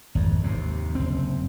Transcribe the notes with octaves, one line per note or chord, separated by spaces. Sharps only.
G#1 F2
D#2 C3
F#1 C4